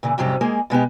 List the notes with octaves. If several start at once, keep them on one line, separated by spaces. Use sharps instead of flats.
A#2 C#3 E3
F2 G#2 C3 F#3 G3 C#4
G#3 A#3 G#4 D#5
B2 G#3 B3 G4